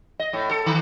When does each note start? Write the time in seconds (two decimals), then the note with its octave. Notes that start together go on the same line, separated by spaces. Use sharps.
0.19 D#5
0.33 A2
0.51 A4
0.66 D#3